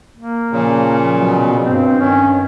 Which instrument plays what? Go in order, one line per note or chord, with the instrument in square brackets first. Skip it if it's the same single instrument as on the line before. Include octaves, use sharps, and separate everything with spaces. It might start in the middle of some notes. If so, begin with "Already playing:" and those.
[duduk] A#3
[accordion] A#2 C#3 [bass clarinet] F3
[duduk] B2 [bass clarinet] F#3
[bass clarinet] B3
[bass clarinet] G2 [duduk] C4
[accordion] D#3 [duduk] C#4